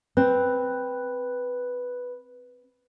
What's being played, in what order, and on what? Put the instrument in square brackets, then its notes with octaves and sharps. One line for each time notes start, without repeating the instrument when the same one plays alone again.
[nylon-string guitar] C4 [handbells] B4